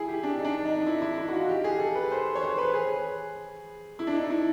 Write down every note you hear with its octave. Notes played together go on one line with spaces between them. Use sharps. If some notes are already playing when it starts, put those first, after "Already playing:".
Already playing: E4 G#4
G4
D4
D#4
D4
D#4
D#4
E4
E4
E4
F#4
F4
G4
G#4
A4
B4
C5
C#5
C5
B4
G#4
E4
D4
D#4
E4